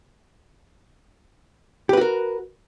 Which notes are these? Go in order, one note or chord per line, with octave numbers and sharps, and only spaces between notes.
F#4 G4 A#4 B4